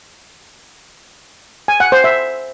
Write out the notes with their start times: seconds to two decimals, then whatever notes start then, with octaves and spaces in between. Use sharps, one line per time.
1.68 G#5
1.80 F#5
1.92 C5
2.04 E5